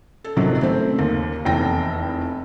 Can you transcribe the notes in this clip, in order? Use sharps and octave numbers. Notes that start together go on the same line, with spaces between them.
A4
G#1 C3 D#3 F3 F#3
C#3 A3 C4
D#2 A#3
F1 E2 A4 G5 A#6